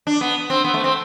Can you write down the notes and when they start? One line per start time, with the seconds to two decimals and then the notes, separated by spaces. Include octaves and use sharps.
0.07 D4
0.21 B3
0.50 C4
0.64 B3
0.74 A3
0.84 C4